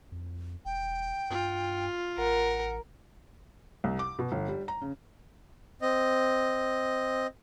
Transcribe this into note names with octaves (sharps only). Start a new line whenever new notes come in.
F2
E1 G5
G2 F4
A1 A#4 F#5
C2
D6
B2
G1
G3
A#5
C#3
C4 D#5